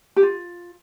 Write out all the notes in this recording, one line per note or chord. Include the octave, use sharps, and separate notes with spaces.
G4
F4